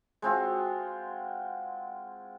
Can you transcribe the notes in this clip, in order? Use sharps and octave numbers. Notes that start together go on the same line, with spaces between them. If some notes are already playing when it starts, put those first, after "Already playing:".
G#3 C4 F4 F#4